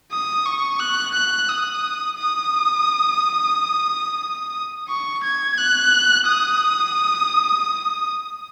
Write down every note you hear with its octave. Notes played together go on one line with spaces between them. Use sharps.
D#6
C#6
F#6
F#6
D#6
D#6
C#6
G#6
F#6
D#6